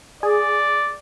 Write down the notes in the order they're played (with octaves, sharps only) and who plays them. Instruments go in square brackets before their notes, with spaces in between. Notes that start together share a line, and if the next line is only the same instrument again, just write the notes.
[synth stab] G#4 [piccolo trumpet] D5